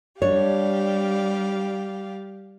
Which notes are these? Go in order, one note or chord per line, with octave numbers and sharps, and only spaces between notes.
G3 D4 G4 C#5 F5